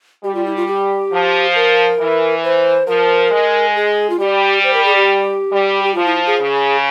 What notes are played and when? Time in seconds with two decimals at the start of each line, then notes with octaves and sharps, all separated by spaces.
0.24 G3 G4
0.35 F4
0.46 E4
0.56 F4
0.67 G4
1.12 F3
1.55 A#4
2.00 E3
2.44 C5
2.87 F3 A#4
3.31 G#3
3.76 G#4
4.10 F4
4.20 G3 G4
4.64 C5
4.74 A#4
4.85 G#4
4.96 G4
5.51 G3
5.84 G4
5.94 F3 F4
6.06 E4
6.27 G#4
6.39 C#3